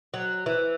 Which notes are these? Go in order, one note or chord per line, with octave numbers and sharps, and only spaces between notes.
F#3
E3